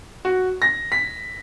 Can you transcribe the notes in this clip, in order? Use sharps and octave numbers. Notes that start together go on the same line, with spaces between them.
F#4
A#6
B6